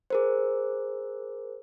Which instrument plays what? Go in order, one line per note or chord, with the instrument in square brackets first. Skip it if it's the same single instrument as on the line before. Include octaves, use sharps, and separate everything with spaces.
[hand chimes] G#4 A#4 C5